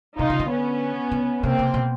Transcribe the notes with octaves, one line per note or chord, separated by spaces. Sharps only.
C3 D#4 F4
C#3
D3
B3 C#4
D3
C3 A#3 C4
C3
B2